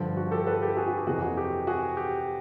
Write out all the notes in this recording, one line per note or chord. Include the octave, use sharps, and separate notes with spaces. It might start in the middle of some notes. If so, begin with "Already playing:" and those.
Already playing: G2 D3 F3
F#4
G4 A4
A4 B4
G4 A4
F#4 G#4
F#4
G4
F2 C3 E3 F#4 G#4
F#4
G4
F#4 G#4
G4